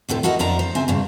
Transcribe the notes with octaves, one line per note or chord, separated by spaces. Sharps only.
D2 A2 C3 A4
E4 F#4 A4 A#4 D#5
F2 F3 A3 D4 A#5
C5
C#3 C4 E5 G#5
G2 A#2 C#3